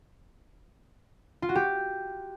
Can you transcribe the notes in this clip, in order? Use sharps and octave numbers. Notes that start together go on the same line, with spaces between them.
F4
F#4
G4